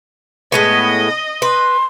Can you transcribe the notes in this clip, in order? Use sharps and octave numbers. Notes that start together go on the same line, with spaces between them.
A2 G#3 B3 D#5
B4 C6